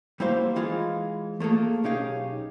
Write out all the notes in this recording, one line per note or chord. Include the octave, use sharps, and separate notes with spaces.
G3 A#3 E4 F#4 C5 F5
E3 G#3 F4
A3 A#3 G#4 A4
B1 C#4 D#4 G4 G#4 F5